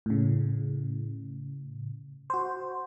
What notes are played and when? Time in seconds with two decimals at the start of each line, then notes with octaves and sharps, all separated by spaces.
0.06 A2 C#3
2.30 F#4 C5